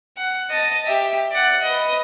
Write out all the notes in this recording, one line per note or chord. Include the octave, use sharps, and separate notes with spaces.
F#5
D#5 A5
G4 E5
D5 F#5
B4 D#5